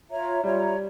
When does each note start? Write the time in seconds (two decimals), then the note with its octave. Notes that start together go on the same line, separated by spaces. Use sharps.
0.10 F4 C#5 E5 A#5
0.43 G3 F4 C#5 E5 A#5